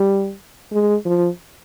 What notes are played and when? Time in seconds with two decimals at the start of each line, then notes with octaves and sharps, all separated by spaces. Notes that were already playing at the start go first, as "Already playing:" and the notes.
Already playing: G3
0.72 G#3
1.06 F3